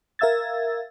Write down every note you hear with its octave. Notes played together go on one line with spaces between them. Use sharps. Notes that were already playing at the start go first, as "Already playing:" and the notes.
A#4 E5 F5 E6 G#6 A6